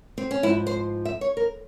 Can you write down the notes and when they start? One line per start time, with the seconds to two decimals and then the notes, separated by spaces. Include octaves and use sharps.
0.18 C4
0.31 C#4
0.43 G#2 F3 E4
0.67 C5
1.05 E5
1.21 C#5
1.37 A#4